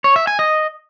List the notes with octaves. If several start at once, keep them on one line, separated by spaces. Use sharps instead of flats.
C#5
E5
G#5
D#5